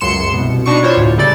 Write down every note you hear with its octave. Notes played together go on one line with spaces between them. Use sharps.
C#2 F#2 C6 C#7 E7
C2 B2
B2 D4 D#4 C#6 C#7
D4 E4 F4 C5 C#5
D2 A2
A#2 C#3 G3 A4 D5 A6